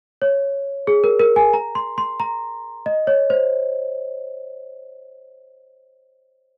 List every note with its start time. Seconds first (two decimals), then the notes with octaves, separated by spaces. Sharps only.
0.22 C#5
0.87 G#4
1.04 A#4
1.20 A#4
1.36 G#5
1.53 A#5
1.75 C6
1.98 C6
2.20 A#5
2.86 D#5
3.07 C#5
3.30 C5